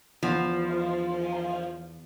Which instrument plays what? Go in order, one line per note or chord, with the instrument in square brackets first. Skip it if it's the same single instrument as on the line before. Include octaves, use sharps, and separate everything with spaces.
[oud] E2 [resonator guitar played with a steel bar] F3